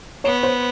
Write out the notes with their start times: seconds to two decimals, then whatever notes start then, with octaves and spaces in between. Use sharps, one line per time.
0.24 B3 C#5
0.43 C5